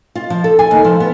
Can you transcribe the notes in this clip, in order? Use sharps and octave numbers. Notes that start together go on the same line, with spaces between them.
F4
F3
A4
G#5
D#2
F3
B3